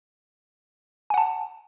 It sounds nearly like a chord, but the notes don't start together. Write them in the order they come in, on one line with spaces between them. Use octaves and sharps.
G#5 F#5 A5